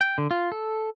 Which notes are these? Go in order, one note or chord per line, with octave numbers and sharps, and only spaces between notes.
G5
D3
F4
A4